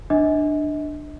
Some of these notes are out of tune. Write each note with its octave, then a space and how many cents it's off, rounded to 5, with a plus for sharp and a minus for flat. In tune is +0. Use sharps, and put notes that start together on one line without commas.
D4 +15 D#5 +40